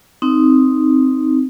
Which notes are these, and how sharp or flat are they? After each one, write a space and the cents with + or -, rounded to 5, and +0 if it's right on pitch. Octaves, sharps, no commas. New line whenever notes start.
C4 +0 D#4 +0